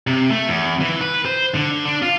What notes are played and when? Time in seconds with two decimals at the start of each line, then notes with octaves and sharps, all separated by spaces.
0.07 C3
0.31 A3
0.48 E2
0.81 E3
1.01 B4
1.25 C5
1.55 D3
1.85 D4
2.02 F4